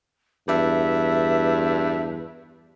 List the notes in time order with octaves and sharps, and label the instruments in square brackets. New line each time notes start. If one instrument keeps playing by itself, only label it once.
[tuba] E2 [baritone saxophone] G2 [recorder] E5